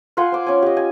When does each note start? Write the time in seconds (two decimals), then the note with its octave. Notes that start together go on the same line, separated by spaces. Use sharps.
0.17 F4 F#5 G#5 C6
0.32 C5 D6
0.47 C#4 G#5
0.62 G4 D#5
0.77 G#5